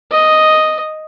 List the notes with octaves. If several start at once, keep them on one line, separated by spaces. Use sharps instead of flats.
D#5